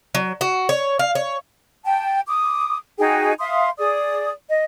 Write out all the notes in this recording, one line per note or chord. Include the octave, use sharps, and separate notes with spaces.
F#3
F#4
C#5
F5
C#5
G5 A5
D6 D#6
D#4 F#4 G#4 G5
E5 F5 C6 D#6
G#4 D5 D#6
D#5